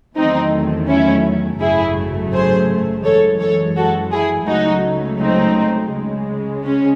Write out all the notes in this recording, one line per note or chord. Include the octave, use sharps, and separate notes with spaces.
E2 D#3 F#3 A3 C4 D#4
C#4 E4
G#1 F#2 C#3 F#3 A3 E4 G#4
G#4 C5
F#2 E3 G#3 A4 C#5
A4 C#5
F#4 A4
E4 G#4
C#2 C#3 F#3 A3 D#4 F#4
C4 D#4
C#2 C#3 G#3
C#4